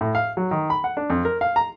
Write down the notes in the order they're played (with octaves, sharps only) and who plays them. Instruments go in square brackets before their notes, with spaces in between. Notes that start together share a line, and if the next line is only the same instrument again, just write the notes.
[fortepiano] A2
F5
F#3
D#3
B5
F#5
D4
F2
A#4
F5
A#5